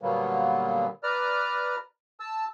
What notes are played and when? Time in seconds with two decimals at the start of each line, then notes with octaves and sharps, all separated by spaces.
0.02 A#2 D3 F#3 G3 A#3 B3
1.03 B4 D5 A#5 F6
2.20 A5 E6